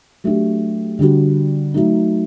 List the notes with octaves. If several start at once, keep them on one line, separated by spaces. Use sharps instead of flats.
F#3 A3 D4 G4
D3 G3 D4 F#4
F#3 A3 D#4